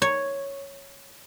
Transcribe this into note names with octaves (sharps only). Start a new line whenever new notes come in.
C#5